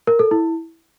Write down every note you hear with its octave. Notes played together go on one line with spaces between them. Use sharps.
A#4
A4
E4